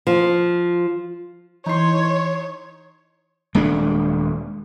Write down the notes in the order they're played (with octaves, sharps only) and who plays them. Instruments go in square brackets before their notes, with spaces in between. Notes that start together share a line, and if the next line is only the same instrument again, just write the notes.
[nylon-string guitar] F3
[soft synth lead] E3 [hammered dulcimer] D#4 C6 [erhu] C#5
[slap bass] D#1 G#3 A3 D4